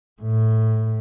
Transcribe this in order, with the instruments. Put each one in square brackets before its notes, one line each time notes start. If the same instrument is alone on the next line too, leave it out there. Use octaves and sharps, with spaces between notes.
[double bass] A2